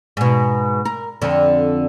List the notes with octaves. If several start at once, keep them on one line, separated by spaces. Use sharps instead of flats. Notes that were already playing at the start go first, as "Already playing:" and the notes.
G#2 B2
A#4
F2 D3